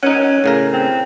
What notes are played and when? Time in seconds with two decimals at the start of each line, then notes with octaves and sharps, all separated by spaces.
0.03 C#4 D#4 F#5
0.44 A2 C#3 A#4
0.73 C4